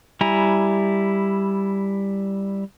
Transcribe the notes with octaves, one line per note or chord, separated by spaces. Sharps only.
G3 E4 G#5 A#5